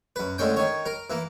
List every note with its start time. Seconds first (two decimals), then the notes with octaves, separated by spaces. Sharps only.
0.16 F#2 B4
0.38 A2 D3 G#3 C#4 G5
0.56 D#3 C#5
0.86 A#4
1.10 E3 A#3